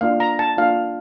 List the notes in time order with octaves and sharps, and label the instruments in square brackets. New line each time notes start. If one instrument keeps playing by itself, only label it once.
[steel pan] A#3 D4 F4 F5
A#5
A5
A#3 D4 F4 F5